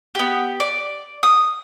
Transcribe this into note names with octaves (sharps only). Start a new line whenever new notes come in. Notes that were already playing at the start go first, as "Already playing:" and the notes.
B3 G4
D5
D#6